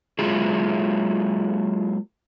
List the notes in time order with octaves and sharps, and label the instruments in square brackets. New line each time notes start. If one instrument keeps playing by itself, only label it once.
[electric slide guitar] F#3 G#3 A#3 E4 F4 G#4